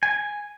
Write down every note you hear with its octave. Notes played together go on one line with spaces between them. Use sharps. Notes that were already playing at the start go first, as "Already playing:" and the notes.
G#5